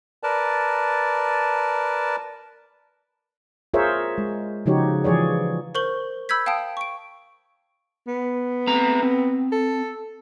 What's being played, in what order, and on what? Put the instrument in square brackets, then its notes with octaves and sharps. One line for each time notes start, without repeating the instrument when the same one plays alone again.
[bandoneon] A#4 B4 D5 A5
[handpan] F4 G#4 A#4 C5 C#5 E5
G#3
C#3 F3 D#4 F#4 G4 C#5
E3 F3 G#4 C#5 D5
[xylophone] A#4 C5 C#6 G6 F#7 G7
B5 E6 G6 G#6 B6
F5 G5 A5 D#6 D7
C#6 D7
[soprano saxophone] B3
[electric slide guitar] A3 C4 A#5
C4
[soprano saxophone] A4